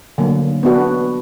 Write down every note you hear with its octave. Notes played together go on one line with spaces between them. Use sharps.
D3 F#3 A#3
B3 D4 F#4 B4